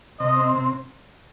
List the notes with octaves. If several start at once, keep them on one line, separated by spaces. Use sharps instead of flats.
C3 D#5
C4
C3